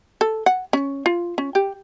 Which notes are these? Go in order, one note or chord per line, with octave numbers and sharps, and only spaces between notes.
A4
F#5
C#4
F4
C#4
G4